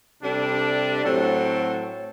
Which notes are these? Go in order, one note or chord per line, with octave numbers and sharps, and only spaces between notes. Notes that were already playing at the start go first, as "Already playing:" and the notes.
C3 G3 D4 A4
A2 F#3 C4 F#4 A4